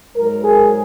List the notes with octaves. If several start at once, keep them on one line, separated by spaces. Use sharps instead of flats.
G#2 F#3 A#4
G#4